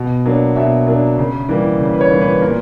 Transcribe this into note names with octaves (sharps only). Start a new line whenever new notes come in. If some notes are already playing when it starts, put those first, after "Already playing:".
Already playing: B2
F#3 A#3 D4
B2 E5
F#3 A#3 D4
C#3
E3 G3 A#3
C#3
B4
C#5
E3 G3 A#3
B4
A#2 A#4